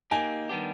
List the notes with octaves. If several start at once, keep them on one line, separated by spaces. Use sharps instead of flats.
A#3 D#4 G4 G#5
D#3 G3 B3 D4 G4